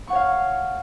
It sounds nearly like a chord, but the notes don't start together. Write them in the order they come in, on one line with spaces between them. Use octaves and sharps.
C#6 F#5 C#5 F5